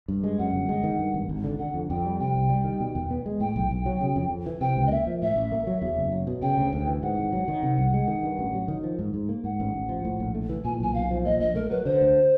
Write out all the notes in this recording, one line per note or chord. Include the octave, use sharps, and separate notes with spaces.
G2
G#3
F#2 F#5
G1
G#3
D#3
G2
G#1
G#1
D3
D3 F#5
F2
F2 G5
G3
C3 G5
C2
G3
D#3
B2
E2
B3
G#3
A2 G5
B1
B1
F#3
C#3
F2
F2
E3
C3 G5
C#2
D#5
A#3 E5
F3
A2 E5
A1
A#3
F#3
E2
F#1
F#3
B2
C#3 G5
D2
D2
E3
G#2 F#5
G#1
F#3
D#3
C3
C2
G#3
D#3
G2
A1
F#3
D#3
F3
G#2
G#2
A#3
G#2 F#5
A1
A1
F3
A2
A#1
A3
E3
A#2 G#5
B1 G#5
B1 F5
F3
A#2 D#5
A#1 D#5
A3 A#4
F#3 B4
D3 C5
D2